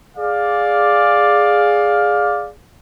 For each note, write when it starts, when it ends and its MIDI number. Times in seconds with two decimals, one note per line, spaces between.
0.18 2.51 68
0.18 2.51 74
0.18 2.51 77